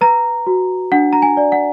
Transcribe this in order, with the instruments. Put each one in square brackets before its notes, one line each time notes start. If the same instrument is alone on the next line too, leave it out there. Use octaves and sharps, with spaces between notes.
[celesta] B4 A#5
F#4
D4 F#5
A#5
G#5
D5
F#5